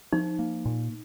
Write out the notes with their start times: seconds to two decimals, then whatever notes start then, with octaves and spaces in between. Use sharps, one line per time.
0.13 F3 D#4
0.39 A#3
0.66 A#2